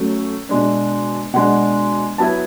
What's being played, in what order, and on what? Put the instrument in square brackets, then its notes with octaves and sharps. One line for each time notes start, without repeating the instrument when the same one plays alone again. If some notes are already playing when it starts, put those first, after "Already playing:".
Already playing: [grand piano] F#3 A3 C#4
B2 G#3 D4
B2 G#3 D4 F#5
F#3 B3 E4 A5